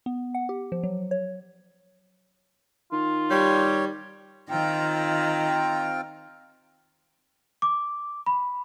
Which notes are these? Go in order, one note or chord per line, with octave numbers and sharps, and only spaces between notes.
B3
F#5
G4
F3
F#3
C#5
D#3 F4
G3 C#5
D#3 C4 F4 G5 A#5
D6
B5